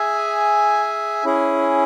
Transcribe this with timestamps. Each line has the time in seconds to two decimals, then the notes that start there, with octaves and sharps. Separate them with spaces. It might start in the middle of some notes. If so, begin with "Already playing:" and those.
Already playing: G#4 E5 G#5
1.25 C#4 E4 G#4